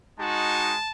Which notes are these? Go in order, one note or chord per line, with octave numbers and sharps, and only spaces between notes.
G#3 D#4 F#4 A5